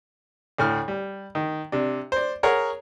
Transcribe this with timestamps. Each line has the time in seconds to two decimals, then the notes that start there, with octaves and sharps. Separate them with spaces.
0.58 D2 A2 F6
0.88 G3
1.35 D#3
1.72 C3 D4
2.12 C5 D5
2.43 G#4 A#4 C#5 F#5